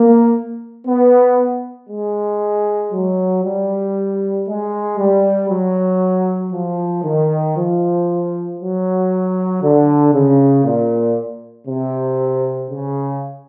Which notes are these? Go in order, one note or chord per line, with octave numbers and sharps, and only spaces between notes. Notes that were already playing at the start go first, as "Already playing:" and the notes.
Already playing: A#3
B3
G#3
F#3
G3
G#3
G3
F#3
F3
D#3
F3
F#3
D3
C#3
A#2
C3
C#3